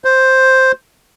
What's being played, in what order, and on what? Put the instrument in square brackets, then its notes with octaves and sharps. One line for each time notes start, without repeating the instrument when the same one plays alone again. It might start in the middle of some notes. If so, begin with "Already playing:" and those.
[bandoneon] C5